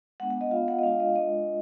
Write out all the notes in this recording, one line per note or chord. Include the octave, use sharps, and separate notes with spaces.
G#3 B3 D4 F#5
F#5
D#5
B3 F4 F5
F#5
D#5
G#3 D4 F4 F5
D#5
G#3 D4 F4 D#5